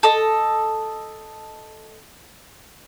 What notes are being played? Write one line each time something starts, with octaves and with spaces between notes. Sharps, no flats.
A4 D#5